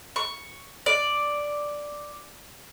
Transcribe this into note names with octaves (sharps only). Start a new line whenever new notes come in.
C#6
D5